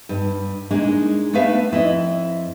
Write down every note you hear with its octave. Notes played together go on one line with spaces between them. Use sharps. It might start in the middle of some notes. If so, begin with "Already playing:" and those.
G2
G#3 A#3 D4 D#4
A3 B3 D4 B4 E5 F5
F2 E4 G4 D#5